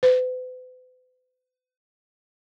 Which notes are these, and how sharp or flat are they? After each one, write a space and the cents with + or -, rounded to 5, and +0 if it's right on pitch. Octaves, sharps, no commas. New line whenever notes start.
B4 +45